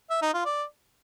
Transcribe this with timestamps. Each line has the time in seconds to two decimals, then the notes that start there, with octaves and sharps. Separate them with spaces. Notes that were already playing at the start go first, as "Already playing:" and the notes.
0.10 E5
0.22 D#4
0.34 F4
0.45 D5